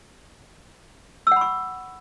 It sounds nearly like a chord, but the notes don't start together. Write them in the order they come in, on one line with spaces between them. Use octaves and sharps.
E6 F#5 B5 C#6